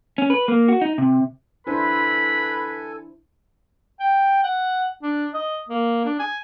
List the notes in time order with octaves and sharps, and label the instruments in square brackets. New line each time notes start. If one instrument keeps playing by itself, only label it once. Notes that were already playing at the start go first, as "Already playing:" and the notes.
[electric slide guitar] C#4
B4
A#3
F#4
D#4
C3
[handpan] D4 E4 C5 [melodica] A4 G#5 [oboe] B4 [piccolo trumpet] B5
[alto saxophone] G5
F#5
D4
D#5
A#3
D4
G#5